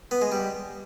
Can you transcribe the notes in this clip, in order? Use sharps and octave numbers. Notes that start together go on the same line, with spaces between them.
B3
G#3
G3